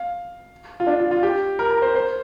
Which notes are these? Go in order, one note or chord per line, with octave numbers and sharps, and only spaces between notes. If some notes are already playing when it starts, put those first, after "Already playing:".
Already playing: F5
F4
D4
F4
F4
G4
A#4
A#4
C5
C5